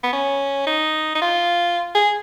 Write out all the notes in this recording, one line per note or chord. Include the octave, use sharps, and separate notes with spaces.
B3
C#4
D#4
D#4
F4
G#4